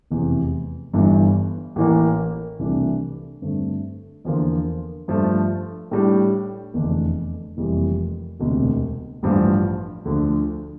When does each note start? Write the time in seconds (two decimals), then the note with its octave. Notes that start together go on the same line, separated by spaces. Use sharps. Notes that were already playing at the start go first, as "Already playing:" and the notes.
0.11 F1 E2 C3 E3
0.93 G1 G2 E3
1.76 A1 A2 E3 A#3
2.59 C2 C3 E3 A3 D4
3.42 G2 D3 A3 C4
4.25 E2 D3 F3 A#3 F4
5.08 G2 F3 A3
5.91 A2 G3 D4
6.74 F1 E2 D3 A3 D4
7.57 F1 F2 E3 G3 A#3
8.40 E1 D2 C3
9.23 A1 G2 F3
10.05 D2 D3 F3